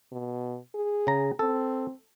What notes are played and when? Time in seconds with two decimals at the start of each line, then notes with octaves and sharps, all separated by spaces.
0.12 B2
0.74 G#4
1.07 C#3 A#5
1.39 C4 A4